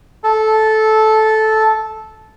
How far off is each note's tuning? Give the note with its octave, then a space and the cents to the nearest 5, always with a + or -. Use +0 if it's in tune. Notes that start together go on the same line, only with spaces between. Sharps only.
A4 -15